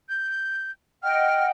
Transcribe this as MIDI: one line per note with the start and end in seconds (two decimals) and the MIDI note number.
0.09 0.71 91
1.03 1.50 75
1.03 1.50 78
1.03 1.50 79
1.03 1.46 89